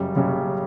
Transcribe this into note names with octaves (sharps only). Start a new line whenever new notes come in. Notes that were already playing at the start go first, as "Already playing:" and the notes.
Already playing: F#1 F#2 C#3 G3
F#1 F#2 C#3 G3